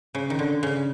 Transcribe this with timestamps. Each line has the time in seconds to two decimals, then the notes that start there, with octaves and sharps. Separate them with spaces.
0.15 C#3
0.30 D#3
0.39 D3
0.63 C#3